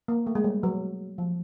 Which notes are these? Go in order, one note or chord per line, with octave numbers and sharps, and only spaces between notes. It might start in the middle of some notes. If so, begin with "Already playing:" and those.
A#3
A3
G#3
G3
F#3
F3